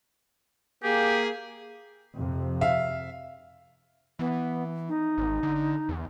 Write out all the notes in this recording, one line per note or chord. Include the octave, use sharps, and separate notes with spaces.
A#3 G4 G#4
F2 C3
E5 F5
E3 B3
D#4
G#1
D3
E2